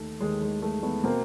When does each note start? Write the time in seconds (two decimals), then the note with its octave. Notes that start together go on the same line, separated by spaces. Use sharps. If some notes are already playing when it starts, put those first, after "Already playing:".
Already playing: D#2 D#3 A3
0.21 D#2 D#3 G#3
0.42 G#3
0.62 A3
0.83 A3 B3
1.04 B2 A#3 C4